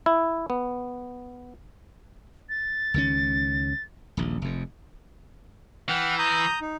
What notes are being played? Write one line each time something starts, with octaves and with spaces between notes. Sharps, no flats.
E4
B3
A6
C#2 D#3 C#4
D#1 A#1
F1 F2
E3 F#5 G5 F6
A#5 D#6 G6
D#4